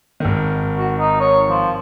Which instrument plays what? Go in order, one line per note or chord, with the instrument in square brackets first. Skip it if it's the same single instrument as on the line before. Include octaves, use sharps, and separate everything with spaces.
[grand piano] G#1 D#3
[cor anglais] F#4
D#4
C#5
F3